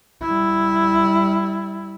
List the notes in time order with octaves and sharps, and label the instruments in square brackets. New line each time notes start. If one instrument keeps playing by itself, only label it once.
[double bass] G3 E4